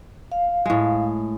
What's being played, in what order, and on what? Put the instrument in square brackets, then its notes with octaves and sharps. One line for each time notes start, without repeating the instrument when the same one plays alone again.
[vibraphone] F5
[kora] A2 G#3